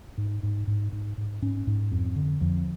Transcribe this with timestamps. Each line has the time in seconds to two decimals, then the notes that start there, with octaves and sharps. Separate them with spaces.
0.18 G#2
0.43 G#2
0.67 G#2
0.92 G#2
1.18 G#2
1.42 G#2 C#4
1.67 G#2
1.91 F2
2.16 D3
2.41 F2 F3